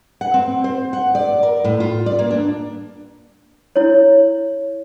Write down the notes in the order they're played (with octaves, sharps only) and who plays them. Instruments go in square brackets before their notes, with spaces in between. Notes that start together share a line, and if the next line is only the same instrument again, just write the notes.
[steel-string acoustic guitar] F#5
C4
C5
F#5
D5
A#4
A2
F4
D5
A#3
D4
[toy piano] E4 C#5